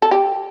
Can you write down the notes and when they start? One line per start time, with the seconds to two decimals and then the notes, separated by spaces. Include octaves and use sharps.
0.02 A4
0.11 G4